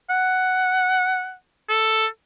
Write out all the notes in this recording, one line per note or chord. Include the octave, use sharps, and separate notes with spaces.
F#5
A4